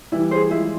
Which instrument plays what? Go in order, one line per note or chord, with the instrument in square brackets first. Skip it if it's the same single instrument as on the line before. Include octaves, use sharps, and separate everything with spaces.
[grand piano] E3 G3 [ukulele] E4
[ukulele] G#4 C5
[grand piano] F3 G#3 [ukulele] E4